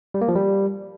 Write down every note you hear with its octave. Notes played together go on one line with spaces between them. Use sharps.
G3
A#3
F3
G3